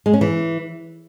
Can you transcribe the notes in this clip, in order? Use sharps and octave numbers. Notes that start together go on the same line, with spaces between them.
G#3
C#4
E3